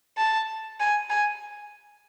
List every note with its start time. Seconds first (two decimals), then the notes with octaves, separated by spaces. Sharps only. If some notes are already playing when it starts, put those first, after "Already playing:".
0.18 A5
0.80 G#5
1.10 G#5